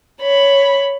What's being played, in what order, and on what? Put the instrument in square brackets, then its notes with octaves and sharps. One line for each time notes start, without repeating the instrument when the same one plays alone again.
[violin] C#5 B5